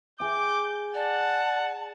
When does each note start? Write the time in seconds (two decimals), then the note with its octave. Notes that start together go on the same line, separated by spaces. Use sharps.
0.20 G#4 G5 D6 G6
0.94 D5 F#5 A5